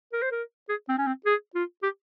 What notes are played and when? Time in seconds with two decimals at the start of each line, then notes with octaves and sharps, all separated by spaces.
0.13 A#4
0.22 C5
0.32 A#4
0.69 G#4
0.89 C4
0.98 C#4
1.07 C4
1.26 G#4
1.55 F4
1.83 G4